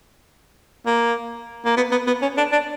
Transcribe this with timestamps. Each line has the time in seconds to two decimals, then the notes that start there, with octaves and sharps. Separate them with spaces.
0.86 A#3
1.65 A#3
1.77 B3
1.91 B3
2.07 B3
2.22 C#4
2.37 D4
2.52 D4